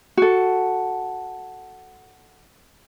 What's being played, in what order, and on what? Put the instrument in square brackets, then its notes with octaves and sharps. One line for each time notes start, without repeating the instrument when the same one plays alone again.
[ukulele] F#4 A4